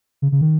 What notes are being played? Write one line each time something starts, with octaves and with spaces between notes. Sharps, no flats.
C#3
C#3
D#3